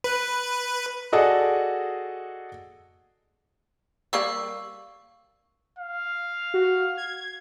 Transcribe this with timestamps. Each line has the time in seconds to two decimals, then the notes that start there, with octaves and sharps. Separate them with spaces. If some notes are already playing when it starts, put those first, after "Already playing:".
0.04 B4
1.12 F#4 G#4 A4 D5 D#5 F#5
4.13 G3 A#3 D5 F5 C#6 E6
5.79 F5
6.54 F#4
6.97 G#6